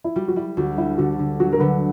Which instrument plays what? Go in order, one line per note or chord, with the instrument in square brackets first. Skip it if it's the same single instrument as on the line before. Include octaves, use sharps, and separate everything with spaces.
[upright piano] E4
[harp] G3 [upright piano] F#4
[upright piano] F#4
[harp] G3 [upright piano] E4
[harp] D2 [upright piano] F#4
[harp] G3 [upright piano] E4
[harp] D3 [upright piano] F#4
[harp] D3
[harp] F#3 [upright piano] F#4
[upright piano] A#4
[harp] D3 [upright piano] B4